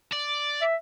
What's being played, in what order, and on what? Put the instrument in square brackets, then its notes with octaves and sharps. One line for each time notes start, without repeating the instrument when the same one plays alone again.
[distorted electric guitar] D5
[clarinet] E5